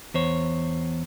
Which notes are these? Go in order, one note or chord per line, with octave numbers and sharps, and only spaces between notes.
E2 C5 C#5